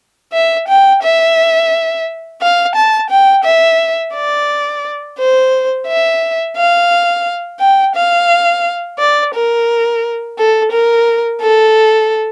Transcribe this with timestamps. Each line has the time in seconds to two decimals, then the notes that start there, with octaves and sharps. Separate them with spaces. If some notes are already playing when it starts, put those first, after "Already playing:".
0.33 E5
0.68 G5
1.03 E5
2.42 F5
2.76 A5
3.10 G5
3.44 E5
4.15 D5
5.18 C5
5.87 E5
6.57 F5
7.60 G5
7.96 F5
8.99 D5
9.34 A#4
10.38 A4
10.72 A#4
11.41 A4